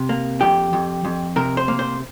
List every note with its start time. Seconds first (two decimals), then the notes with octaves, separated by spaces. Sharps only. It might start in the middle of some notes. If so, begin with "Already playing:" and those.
Already playing: C3
0.09 A#3
0.41 F2 G4
0.73 F2
1.05 F2
1.36 C3 A#4
1.57 C5
1.68 A#3
1.79 C5